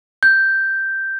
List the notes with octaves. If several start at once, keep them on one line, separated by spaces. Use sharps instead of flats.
G6